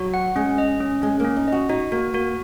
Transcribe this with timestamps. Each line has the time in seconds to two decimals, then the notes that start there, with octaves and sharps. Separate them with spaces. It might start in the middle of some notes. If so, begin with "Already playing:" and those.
Already playing: F#3 F#4
0.14 F#5
0.36 G#3 C#4
0.58 D#5
0.80 C#4
1.02 G#3 C#4
1.20 A#3
1.25 C#4
1.37 D#4
1.48 F#4 D#5
1.69 D#4 F#4
1.92 A#3 F#4
2.14 A#3 F#4